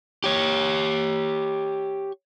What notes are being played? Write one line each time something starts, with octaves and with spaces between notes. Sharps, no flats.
G4 C#5